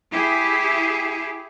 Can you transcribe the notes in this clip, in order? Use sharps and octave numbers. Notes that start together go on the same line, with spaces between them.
E4 G4 G#4